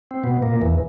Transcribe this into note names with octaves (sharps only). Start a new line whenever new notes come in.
C4
B2 B3
A#2 A#3
E2 E3